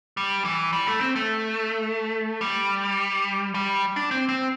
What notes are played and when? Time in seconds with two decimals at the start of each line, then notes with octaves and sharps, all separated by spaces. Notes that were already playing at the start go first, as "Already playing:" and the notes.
0.17 G3
0.45 E3
0.73 G3
0.87 A3
1.01 C4
1.16 A3
2.41 G3
3.55 G3
3.96 D4
4.11 C4
4.29 C4